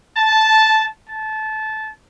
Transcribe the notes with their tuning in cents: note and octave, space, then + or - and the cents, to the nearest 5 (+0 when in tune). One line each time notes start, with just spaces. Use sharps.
A5 -5
A5 -20